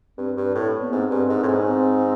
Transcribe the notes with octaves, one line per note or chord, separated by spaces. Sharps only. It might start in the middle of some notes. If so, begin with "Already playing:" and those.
G2 C4
G2
A2
B3
G#2 C4
G2
G#2
A2
G#2
C4